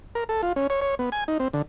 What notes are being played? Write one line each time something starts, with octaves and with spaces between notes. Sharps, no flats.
A#4
A4
F4
C#4
C#5
C#5
B3
G#5
D#4
C4
D3